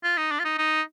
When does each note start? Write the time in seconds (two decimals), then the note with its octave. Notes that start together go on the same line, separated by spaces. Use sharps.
0.04 F4
0.17 D#4
0.32 D4
0.39 F4
0.45 D#4
0.58 D#4